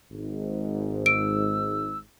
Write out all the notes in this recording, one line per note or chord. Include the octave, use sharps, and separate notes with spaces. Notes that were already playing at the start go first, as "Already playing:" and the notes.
G#1 G#2
E6 D7